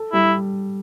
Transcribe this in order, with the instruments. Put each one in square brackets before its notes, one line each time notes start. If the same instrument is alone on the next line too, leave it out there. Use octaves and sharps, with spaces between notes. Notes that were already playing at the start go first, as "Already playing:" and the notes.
Already playing: [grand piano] A4
[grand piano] G3 [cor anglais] E4